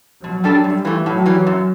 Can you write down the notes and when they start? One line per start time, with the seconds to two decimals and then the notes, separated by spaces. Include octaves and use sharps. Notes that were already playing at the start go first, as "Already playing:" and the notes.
0.23 B2 F#3
0.44 G3 D4 A4
0.64 F#2 G3
0.85 E3 A3
1.06 A2 F#3
1.26 E3 G3
1.47 F#2